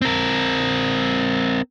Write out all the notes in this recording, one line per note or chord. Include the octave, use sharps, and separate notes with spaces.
C4 A#4